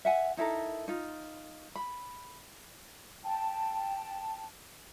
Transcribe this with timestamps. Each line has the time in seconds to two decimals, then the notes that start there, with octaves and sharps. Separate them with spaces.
0.05 E5 F#5 G#5
0.37 D#4 E4 A4 A#4
0.88 D#4 F4
1.76 B5
3.24 G5 A5